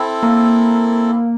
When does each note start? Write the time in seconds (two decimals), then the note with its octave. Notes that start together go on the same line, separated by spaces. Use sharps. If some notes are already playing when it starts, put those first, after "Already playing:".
Already playing: C4 E4 A4
0.23 A#3